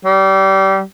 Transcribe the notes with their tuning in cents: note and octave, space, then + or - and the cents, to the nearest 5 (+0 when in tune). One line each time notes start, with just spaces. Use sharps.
G3 -25